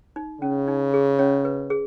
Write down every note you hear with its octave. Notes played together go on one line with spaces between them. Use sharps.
D#4
C#3 C#4
D#4
G#4
C#4 C#5
B4
G#4